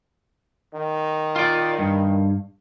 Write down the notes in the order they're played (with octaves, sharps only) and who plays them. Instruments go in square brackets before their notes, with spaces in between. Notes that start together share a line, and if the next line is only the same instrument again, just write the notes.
[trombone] D#3
[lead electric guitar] F4 D5
G2